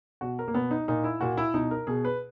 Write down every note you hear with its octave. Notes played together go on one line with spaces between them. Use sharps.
B2 F#4
A#4
A#3
B2 B3
D#4
A#2 D#4
E4
A#2 F#4
E4
B2 D#4
A#4
B2 G#4
B4